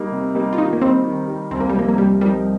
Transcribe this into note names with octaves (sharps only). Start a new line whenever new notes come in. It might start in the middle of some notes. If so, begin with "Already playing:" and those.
Already playing: G3 A#3 D#4
C3
G3 A#3 D#4
F4
D#3 D#4
A#3
G3 C4 D#4
D#3
G3 D#4
C2 C4
A#3
G3
C3 F3 A#3 D#4 A#4
A#3
C2 G3
C3 F3 G3 D#4 A#4